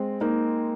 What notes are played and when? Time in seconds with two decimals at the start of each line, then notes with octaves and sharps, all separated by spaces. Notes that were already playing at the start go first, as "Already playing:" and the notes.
Already playing: G#3 C4
0.21 A#3 D#4